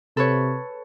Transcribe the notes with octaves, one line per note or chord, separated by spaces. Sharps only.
C3 A4 B4 C#5